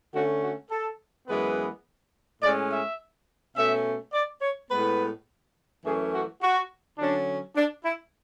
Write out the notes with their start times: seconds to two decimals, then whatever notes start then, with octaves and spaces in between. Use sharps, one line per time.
0.14 D3 A3 C#4 F#4
0.43 F#4
0.71 A4
1.28 F#2 E3 G#3 B3 B4
2.42 A2 G#3 C#4 D5
2.71 E5
3.56 B2 A3 C#4 E5
4.13 D5
4.41 C#5
4.70 A2 G#3 B3 B4
5.84 F#2 E3 A3 C#4 G#4
6.13 F#4
6.42 F#4
6.98 D3 F#3 C#4 D4
7.56 D4
7.84 E4